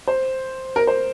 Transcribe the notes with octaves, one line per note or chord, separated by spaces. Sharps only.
C5
A#4
C5